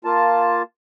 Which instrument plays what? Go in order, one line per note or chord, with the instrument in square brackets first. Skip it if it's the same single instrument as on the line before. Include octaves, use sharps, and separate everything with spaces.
[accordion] A#3 F4 A5